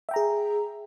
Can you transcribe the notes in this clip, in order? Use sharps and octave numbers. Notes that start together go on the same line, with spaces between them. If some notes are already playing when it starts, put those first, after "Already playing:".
G#4 E5 G5 A#5